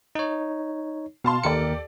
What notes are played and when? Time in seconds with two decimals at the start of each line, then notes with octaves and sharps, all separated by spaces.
0.15 D#4 C#5
1.24 B2 F5 A5 C6
1.44 D#2 G4 A4 A#4 D5 C#7